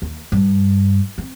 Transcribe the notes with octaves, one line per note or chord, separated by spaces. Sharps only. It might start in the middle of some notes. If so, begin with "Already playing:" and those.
D#2
G2
C4